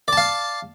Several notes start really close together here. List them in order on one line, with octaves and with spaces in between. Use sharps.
D5 A5 F5